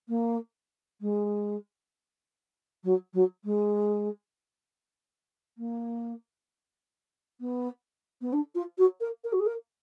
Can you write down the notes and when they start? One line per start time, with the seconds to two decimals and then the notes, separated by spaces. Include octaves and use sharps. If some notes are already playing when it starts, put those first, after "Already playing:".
0.08 A#3
1.00 G#3
2.83 F#3
3.13 F#3
3.44 G#3
5.57 A#3
7.40 B3
8.21 B3
8.32 D4
8.54 F4
8.77 F#4
9.00 A#4
9.24 A#4
9.32 F#4
9.39 G#4
9.46 A#4